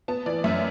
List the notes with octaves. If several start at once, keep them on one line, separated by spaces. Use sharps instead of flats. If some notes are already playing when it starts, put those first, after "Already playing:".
B3 A5
E3 D5
F#2 E5